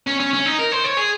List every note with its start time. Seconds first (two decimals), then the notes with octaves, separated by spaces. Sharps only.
0.07 C#4
0.20 C#4
0.33 C#4
0.45 D#4
0.59 A#4
0.72 C5
0.84 C#5
0.97 G#4